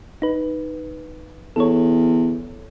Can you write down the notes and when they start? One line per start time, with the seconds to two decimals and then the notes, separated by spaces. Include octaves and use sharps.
0.22 D#4 B4
1.56 E2 A4 C#5